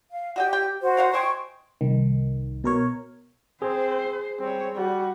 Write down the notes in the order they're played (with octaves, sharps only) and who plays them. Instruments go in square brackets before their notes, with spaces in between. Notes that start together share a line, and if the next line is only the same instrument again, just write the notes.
[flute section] F5
[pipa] F#4 D#5 G5 [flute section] G4
[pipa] G5
[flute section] F#4 C5
[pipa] A#4 F5 F#5
[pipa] C5 D#5 G#5 [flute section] G5 C#6
[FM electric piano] C2 D#3
B2 A#4 C#5
[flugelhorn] C4 [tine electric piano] G#4 [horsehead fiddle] C5
[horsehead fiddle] G3 C#5 [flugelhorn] C4
[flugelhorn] G3 [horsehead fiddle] F#4